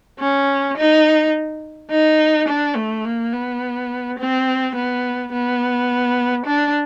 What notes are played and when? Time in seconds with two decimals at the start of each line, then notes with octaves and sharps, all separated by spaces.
0.20 C#4
0.77 D#4
1.91 D#4
2.48 D4
2.76 A3
3.05 A#3
3.33 B3
4.19 C4
4.75 B3
5.32 B3
6.46 D4